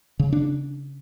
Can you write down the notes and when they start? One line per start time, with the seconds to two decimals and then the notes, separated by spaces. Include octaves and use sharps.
0.19 C#3
0.32 D4